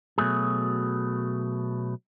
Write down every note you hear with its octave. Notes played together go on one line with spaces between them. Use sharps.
B2 F#3 A3 G#4